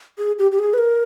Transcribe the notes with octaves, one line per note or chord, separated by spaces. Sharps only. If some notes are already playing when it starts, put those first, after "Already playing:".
G#4
G4
G4
G#4
B4
A#4